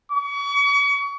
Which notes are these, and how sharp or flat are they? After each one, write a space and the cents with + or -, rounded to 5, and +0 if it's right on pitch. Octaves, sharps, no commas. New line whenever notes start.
C#6 +35